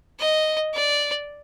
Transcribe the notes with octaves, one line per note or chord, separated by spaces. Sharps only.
D#5
D5